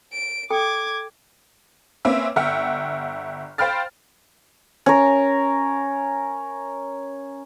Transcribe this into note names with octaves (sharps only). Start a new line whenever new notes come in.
D7
A4 G5 D6 G#6
A#3 C4 C#4 B4 E5
G1 E5 F#5 G5 F6
C5 F5 G5 B5 F6 A6
C#4 A#4